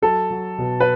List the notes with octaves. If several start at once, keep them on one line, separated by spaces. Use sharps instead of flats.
F#3 A4
F#3
B2
B4